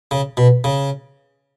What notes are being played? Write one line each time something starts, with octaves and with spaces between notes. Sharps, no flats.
C#3
B2
C#3